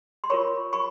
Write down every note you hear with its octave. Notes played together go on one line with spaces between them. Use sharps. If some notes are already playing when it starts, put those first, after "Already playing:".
C6
F4 A#4 C#5 B5 C#6
B5 C#6